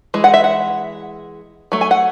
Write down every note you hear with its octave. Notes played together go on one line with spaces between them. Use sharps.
E3 G#3
F#5
E5
F#5
F#3 A3
G#5
F#5